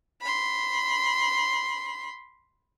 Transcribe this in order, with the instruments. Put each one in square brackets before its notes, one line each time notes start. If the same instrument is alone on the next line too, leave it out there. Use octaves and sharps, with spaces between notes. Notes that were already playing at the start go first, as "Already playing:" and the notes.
[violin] B5 C6